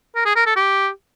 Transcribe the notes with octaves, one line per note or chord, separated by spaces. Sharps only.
A#4
G#4
A#4
A4
G4